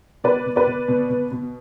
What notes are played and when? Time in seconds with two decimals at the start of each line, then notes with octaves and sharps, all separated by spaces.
0.24 B2 B4 D5
0.46 B2
0.56 B4 D5
0.67 B2
0.88 B2
1.10 B2
1.31 B2